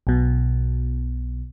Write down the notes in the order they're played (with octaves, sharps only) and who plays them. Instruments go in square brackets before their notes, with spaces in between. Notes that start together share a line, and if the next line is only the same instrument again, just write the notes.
[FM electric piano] B1 B2